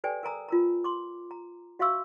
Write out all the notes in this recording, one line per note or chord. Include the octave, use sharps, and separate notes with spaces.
G4 A4 B4 D5 G5 G#5
A#4 G#5 A#5 D#6
F4 A#4 A#5
C6 D6
A#5
F#4 E5 F5 C6 C#6 E6